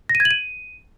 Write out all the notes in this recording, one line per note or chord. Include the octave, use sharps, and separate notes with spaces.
A#6
D#7
G#6
F#7
D#7